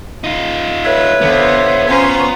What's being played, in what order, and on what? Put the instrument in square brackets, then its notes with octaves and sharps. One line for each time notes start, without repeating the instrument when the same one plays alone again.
[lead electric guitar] D#4 F4
[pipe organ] A4 C#5 E5 [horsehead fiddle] B4
[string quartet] D3 F4 C5 [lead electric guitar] B3
[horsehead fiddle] C#4 C5 [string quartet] F4 A#5